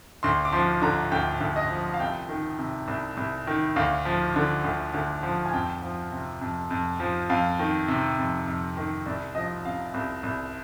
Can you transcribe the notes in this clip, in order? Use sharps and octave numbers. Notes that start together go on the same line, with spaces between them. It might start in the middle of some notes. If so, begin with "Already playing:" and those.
D2 C6
D6
F3 C6
D3 A#5
D2 G5
D2
D#5
F3
F5
C2 G5
D#3
C3
C2
C2
D#3
D2 F5
F3
D3
D2
D2
F3
G#5
F2 G5
F3
C3
F2
F2
F3
F2 F5
D#3
C3
F2
F2
D#3
C2 D5
F3 D#5
C3 F5
C2
C2